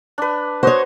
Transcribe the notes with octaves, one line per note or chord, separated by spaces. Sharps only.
D4 B4
F#4 C5 C#5 D#5